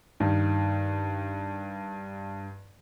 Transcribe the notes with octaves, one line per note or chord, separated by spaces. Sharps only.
G2 D#3